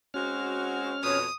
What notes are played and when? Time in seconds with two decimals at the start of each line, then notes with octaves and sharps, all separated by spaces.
0.14 G#3 C4 C#4 F#4 F6
1.03 F2 B2 C#5 D#6